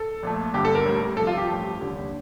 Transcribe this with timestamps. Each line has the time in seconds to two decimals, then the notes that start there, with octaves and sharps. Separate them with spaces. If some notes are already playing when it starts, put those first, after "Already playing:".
Already playing: A4
0.23 A#1 A#2 A3
0.54 G1 G2 D3 G4
0.65 A4
0.75 A#4
0.86 A1 A2 G3
1.17 C2 C3 F3 A4
1.27 F4
1.37 G4
1.48 A1 G2 F3 A3
1.79 F1 D#2 D3 G3